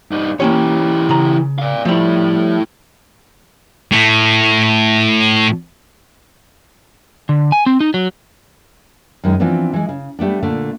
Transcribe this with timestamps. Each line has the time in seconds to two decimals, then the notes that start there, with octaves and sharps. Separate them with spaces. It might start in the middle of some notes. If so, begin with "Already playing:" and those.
0.11 G2 D#4
0.40 E3 A#3 C#4 G4 C#5
1.09 C#3 A#5
1.59 D5 F5
1.85 F3 G3 A3 E4
3.91 A2 A3
7.29 D3
7.52 G#5
7.66 C4
7.80 D#4
7.94 F#3
9.24 F#2 D#3 G#3
9.40 E3 F3 B3 C4 D4
9.73 E3 G#3
9.89 C#3
10.19 G3 A3 B3 D4
10.42 A#2 D3 A3